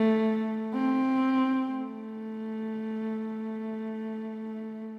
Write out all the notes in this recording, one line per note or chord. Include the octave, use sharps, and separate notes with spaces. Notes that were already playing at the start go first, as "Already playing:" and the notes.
Already playing: A3
C4
A3